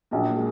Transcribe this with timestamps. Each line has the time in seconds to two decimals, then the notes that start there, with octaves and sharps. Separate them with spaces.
0.11 A#1 F#3 A#3
0.29 A#3
0.36 G#3